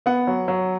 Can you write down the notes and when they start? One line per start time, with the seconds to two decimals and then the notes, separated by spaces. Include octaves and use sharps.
0.06 B3 F#5
0.27 F#3
0.48 F#3